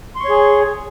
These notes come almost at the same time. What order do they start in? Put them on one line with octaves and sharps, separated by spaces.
C6 C#6 C#5 G#4